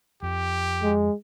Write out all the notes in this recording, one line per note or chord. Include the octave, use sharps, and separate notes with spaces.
F2 G4
G#3